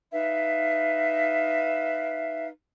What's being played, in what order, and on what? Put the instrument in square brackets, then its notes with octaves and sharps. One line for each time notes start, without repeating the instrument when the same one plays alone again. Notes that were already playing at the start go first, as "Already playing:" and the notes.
[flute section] D#4 B4 E5 F5